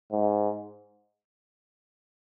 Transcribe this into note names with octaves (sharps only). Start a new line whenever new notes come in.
G#2